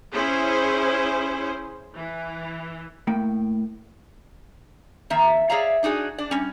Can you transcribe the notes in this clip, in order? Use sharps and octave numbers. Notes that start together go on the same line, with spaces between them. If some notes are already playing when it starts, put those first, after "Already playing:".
C#4 E4 G#4 C5
E3
A2 A#3 G5
F2 D#3 A#3 E5
G#4 C#5 D5 E5 F5 A#5
D4 D#4 F#4 G#4
D4 D5
G3 C#4